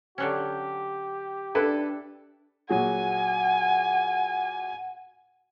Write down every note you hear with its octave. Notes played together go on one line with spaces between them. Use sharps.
D3 F#3 C#4 G4
D4 E4 A4 B4
A#2 F#3 G#4 F#5 G#5